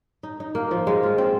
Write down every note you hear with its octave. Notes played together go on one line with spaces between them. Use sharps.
D#4
D#4
A#3
F3
G#3
F4
C4